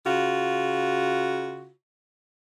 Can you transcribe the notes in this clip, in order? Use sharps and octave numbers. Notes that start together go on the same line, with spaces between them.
C#3 F4 F#4